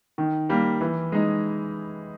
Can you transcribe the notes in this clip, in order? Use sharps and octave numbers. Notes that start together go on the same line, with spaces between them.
D#3
G3 A#3
E3
G#3 D#4